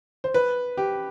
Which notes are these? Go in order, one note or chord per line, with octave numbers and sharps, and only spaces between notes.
C5
B4
G4